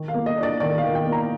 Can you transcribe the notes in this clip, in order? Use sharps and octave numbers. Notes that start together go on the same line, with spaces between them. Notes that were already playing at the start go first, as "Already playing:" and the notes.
Already playing: D#3
F5
A#3
D#5
D4
D5
D#3 D5
F5
D#3
G5
A#3
A#5